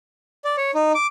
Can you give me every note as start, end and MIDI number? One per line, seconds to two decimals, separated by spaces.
0.45 0.56 74
0.57 0.71 73
0.75 0.92 63
0.95 1.07 86